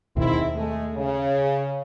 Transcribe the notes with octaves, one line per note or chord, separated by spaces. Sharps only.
D#2 G#2 B2 D#3 C4 E4
G#3 A3
C#3